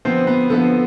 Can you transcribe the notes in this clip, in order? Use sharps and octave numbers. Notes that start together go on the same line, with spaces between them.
D3 F3 B3 C4 C5
B3 B4
D3 F3 B3 A4